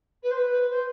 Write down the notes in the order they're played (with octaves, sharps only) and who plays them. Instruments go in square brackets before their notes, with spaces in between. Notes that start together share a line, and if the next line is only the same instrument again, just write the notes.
[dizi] B4
C5
B4
C5